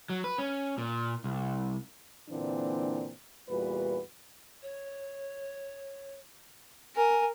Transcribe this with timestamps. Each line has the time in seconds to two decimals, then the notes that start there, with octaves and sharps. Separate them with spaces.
0.10 F#3
0.24 B4
0.38 C#4
0.78 A#2
1.24 C2
2.29 A#2 D3 E3 A#3 C4 D4
3.49 E2 A#2 G3 F#4 B4
4.62 C#5
6.95 A#4 G#5